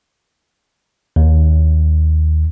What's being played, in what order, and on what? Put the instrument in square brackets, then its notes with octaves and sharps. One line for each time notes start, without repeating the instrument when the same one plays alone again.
[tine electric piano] D#2